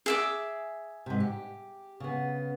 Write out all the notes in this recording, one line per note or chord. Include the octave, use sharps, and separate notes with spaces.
G#4 E5 D6
G#2 C3
G4
C#3 B3